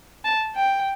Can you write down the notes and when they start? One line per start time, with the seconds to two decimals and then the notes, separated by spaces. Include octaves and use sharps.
0.25 A5
0.55 G5